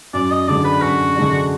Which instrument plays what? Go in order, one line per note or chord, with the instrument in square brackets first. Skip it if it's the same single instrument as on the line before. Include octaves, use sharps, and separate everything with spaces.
[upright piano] F#2 [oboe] D5
[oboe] D#5
[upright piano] D3 G#3 D4 [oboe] D5
[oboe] B4
[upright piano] F#2 [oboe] F#4
[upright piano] D3 G#3 D4